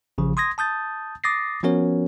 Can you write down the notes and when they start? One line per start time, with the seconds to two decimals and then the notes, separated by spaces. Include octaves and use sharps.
0.18 A1 C#3 F3
0.37 C6 D#6 G#6 A#6
0.58 A5 D#6 G6 A6
1.24 D6 D#6 A6 A#6 C7
1.63 F3 B3 C#4 F#4 A#4 C#5